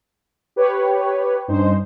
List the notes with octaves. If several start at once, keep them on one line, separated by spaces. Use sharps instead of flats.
G4 B4 C#5
G2 C#4 D#4 C5